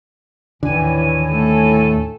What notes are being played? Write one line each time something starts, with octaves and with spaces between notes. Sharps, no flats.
D#2 A2 D3 E3 G#5
A3 A4